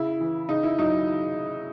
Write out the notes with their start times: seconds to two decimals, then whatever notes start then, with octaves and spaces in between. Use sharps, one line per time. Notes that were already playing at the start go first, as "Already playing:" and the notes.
Already playing: C#3 E4
0.20 E3
0.49 C#3 D#4
0.63 E4
0.78 F#3 D#4